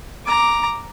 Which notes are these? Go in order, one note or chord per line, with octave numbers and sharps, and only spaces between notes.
A#5 D6